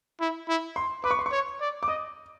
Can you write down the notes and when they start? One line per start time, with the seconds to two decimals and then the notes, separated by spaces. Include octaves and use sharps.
0.20 E4
0.48 E4
0.76 C6
1.04 B4 D6
1.11 C#6
1.19 C6
1.26 C#6
1.31 C#5
1.61 D5
1.83 D6
1.88 D#5 D#6